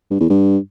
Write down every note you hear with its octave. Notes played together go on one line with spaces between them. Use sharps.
G2
E2
G2